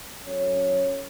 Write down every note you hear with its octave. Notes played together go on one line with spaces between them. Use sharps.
F#3 C#4 A4 C#5